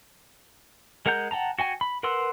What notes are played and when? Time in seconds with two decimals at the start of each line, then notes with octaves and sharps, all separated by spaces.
1.06 G#3 A#4 F#5 A#5 G6
1.31 F#5 G5 A5 A#5
1.59 F#4 G5 G#5
1.81 B5
2.03 A#4 B4 F#5 C6 E6